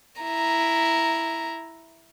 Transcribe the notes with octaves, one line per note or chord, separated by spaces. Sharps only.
E4 A#5